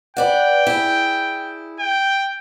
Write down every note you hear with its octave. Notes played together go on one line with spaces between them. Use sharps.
B4 D5 F#5 G5
E4 G#4
G5